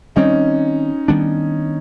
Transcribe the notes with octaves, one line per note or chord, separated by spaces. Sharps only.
D#3 G3 C4 C#4 D#4
D#3 G3 B3 D4